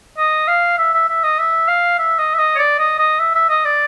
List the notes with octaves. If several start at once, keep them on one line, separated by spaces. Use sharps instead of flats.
D#5
F5
E5
E5
E5
D#5
E5
F5
E5
D#5
E5
D#5
C#5
D5
D#5
D#5
E5
E5
D#5
D5